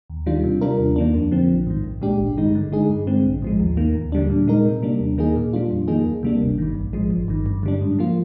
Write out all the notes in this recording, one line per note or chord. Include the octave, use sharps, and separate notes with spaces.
D#2
D#3 G3 D4 F4
C3
G3 D4 F4 A#4
D#2
D#3 A#3 D4
F2
D3 F3 C4
A#1
G#2 D#3
C2
A#2 G#3 D4 G4
G#1
G2 D#3 G#3 D#4
D3
G#3 D#4 G#4
G2
D3 G#3 C4
A#1
G#2 F3 G#3
D#2
D#3 A#3
D#2
D3 G3 D4
A#2
G#3 D#4 A#4
C3
G3 A#3 D4
D#2
D#3 A#3 D#4 G#4
A#2
G3 D4 F4
F2
D#3 A#3 D#4 G#4
D2
C3 G3 A#3 D4
G1
G2 D#3
A#1
G#2 F3 G#3
G1
G2 D#3
G2
D3 G3 D4
G#2
F3 A#3 F4